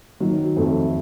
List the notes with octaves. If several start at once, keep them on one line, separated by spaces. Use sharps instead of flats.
D#3 F#3
F2 A3